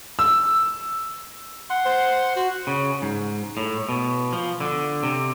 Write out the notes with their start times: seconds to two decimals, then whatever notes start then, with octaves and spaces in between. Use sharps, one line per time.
0.19 E6
1.70 F#5 C6
1.85 C5
2.36 F#4
2.67 C#3
3.02 G#2
3.57 A2
3.89 B2
4.33 F3
4.60 D3
5.03 C3